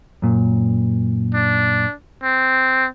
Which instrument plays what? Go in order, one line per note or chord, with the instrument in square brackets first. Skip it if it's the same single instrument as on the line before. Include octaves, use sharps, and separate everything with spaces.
[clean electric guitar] F#2 A#2
[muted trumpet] D4
C4